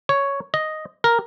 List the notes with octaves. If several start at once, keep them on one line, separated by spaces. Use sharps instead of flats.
C#5
D#5
A#4